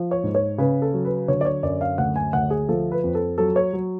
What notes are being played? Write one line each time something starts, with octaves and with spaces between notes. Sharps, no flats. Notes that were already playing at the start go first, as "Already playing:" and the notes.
Already playing: F3
C#5
G#2
C#5
C#3 B4
A4
F#3
B4
D3 C#5
D5
C#5
F#2 D5
F5
D2 F#5
G#5
D2 F#5
G#4
F3 A4
B4
F2
A4
F#3 A4
C#5
F#3